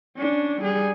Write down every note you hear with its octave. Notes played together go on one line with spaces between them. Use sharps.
C#4 D4
G3 G#4